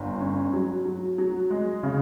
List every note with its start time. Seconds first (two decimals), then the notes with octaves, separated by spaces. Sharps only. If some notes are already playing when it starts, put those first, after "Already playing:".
Already playing: G1
0.20 C#4
0.53 F#3
0.85 F#3
1.18 F#3
1.51 G#3
1.83 C#3